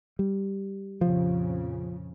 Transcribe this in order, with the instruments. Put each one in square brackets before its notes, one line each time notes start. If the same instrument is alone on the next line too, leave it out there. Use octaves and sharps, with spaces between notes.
[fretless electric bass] G3
[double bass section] A#1 F2 C#3 [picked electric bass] F3